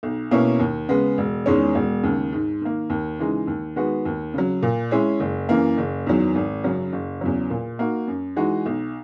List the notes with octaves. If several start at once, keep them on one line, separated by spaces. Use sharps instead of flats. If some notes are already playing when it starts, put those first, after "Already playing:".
B1
B2 A#3 C#4 E4
D#2
C#3 G#3 B3
E1
E2 D#3 G#3 C#4
E1
D#2 C#3
G#2
D#3 A#3
D#2
C#3 E3 G#3 D#4
D#2
D#3 G#3 B3 F#4
D#2
C#3 F#3
A#2
G#3 C#4 E4
F#1
F#2 E3 A#3
F#1
E2 D#3 F#3
G#1
F#2 C#3 F#3
F#1
E2 C#3 F#3
A#2
A#3 D#4 F#4
F#2
E3 G#3 D#4 F#4
B1